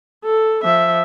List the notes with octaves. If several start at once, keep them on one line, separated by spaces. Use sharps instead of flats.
A4
F3 E5